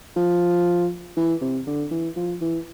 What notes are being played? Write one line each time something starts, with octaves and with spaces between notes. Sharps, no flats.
F3
E3
C3
D3
E3
F3
E3